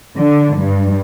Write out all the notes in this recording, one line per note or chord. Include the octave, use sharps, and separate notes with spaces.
D3
G2